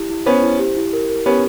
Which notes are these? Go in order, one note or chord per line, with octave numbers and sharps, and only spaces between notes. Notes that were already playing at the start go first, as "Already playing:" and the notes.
Already playing: E4 G4
E4
B3 C#4 C5
E4
G4
E4
A#4
A#4
B3 C#4 G4